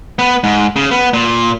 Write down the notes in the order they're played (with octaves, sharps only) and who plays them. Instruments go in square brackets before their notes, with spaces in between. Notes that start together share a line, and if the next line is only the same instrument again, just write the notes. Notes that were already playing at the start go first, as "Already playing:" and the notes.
[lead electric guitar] B3
G#2
C#3
B3
A#2